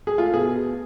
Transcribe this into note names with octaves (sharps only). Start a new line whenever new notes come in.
G#4
A3 F4
B2 G#4